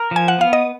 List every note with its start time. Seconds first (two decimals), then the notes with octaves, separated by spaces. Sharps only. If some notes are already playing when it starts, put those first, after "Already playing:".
Already playing: A#4
0.11 F3 G#5
0.28 F#5
0.38 B3 F5
0.53 D#5